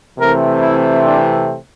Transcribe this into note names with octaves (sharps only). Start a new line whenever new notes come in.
C3 E3 A3 C4 A#4
E4
D4